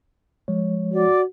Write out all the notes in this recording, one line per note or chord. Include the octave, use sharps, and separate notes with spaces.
F3 G#3 C#5
F#4 D5